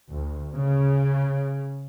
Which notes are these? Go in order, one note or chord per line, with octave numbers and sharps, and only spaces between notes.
D2
C#3